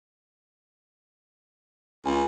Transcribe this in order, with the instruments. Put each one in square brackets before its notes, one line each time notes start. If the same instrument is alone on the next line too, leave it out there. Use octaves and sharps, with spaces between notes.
[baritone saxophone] C#2 [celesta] G#5